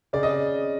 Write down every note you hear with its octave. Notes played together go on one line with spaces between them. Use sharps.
C#3 D5
D#5